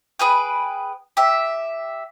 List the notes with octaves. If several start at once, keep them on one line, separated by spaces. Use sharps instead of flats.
G#4 B4 G5
G4 E5